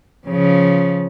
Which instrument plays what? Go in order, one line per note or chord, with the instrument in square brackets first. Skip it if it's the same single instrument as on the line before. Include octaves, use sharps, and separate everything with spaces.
[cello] C#3 F3